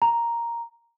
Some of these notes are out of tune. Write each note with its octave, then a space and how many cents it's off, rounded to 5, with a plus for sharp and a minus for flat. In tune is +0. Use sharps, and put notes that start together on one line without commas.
A#5 +5